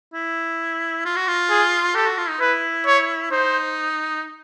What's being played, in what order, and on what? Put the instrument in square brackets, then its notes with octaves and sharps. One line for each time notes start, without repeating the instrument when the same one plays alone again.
[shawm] E4
F4
F#4
F4
[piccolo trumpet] G#4
[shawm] G4 [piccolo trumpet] A4
[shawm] F#4
F4
D#4
[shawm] E4 [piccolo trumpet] B4
[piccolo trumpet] C#5
[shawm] D#4 [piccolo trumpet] C5